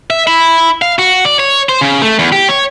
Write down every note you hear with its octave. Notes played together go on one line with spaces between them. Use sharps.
E5
E4
F5
F#4
D5
C#5
C5
C#3
A3
E2
G4
C#5